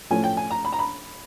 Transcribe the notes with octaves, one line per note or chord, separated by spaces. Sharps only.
A2 F3 A3 C#4 G#5
G5
G#5
A#5
B5
A#5
B5